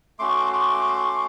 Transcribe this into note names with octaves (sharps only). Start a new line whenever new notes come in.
A3 C#4 F#4 C6 D6
C6 D6